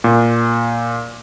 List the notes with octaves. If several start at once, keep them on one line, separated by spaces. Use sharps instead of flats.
A#2